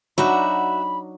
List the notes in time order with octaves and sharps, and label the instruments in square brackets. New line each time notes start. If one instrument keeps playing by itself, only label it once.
[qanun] F#3 D4 D#4 [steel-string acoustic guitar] F#4 E5 [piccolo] B5